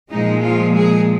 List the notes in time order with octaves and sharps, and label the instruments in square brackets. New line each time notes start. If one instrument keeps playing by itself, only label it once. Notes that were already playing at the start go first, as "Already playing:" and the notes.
[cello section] A#2 F3 G#3 D#4
F4
G#4